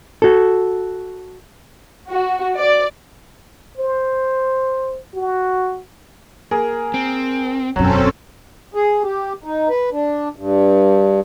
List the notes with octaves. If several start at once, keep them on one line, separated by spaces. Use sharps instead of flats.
F#4 A4
F#4
D5
C5
F#4
A#3 G#4 A#4
C4
E1 F#2 F#3 C4 C#4 A4
G#4
G4
D#4
B4
D4
G2